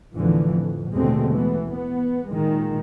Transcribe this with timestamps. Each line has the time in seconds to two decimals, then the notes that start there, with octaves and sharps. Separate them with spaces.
0.14 A1 E2 D3 E3 F3
0.51 F2
0.94 D#2 B2 D3 G#3 A3 C4
1.35 E3 B3
1.70 B3
2.30 A#2 D#3 G#3